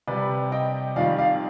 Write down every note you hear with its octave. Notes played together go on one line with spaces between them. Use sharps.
C3 G3 B4 D5
D#5 G5
F2 D#3 G3 D5 F5
D5 F5